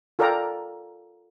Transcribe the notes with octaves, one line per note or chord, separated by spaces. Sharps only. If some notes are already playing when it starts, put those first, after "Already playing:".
F4 A4 A#4 D5 G5 A#5